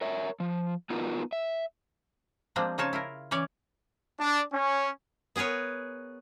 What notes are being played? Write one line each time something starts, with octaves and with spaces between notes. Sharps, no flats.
A#4 C#5 E5
F3
B3 D#4 F4 F#4 A#4 B4
E5
F3 G3 G#3 A#3 C4 D4
C#3 F3 D#4 F4 C#5 A5
E4 F4 A#4
E3 C#4 C#5 D5
D4
C#4
B3 G#4 A#4 B4 C#5